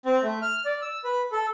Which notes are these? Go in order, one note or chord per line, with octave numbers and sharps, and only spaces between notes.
C4
A3
F6
D5
E6
B4
A4